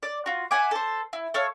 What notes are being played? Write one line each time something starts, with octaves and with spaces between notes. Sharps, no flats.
D5
F4 F#4
E5 F#5 G#5 D6
A4 C5
E4
A4 C#5 F5